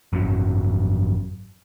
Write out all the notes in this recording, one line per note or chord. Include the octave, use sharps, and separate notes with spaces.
G#1 F#2 D#3 F#3